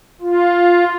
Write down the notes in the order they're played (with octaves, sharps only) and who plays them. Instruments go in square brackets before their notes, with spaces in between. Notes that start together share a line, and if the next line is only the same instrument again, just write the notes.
[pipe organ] F4